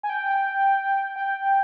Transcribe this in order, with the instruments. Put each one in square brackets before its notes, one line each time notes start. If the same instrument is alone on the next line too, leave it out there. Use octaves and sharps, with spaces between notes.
[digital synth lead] G#5
G5
G5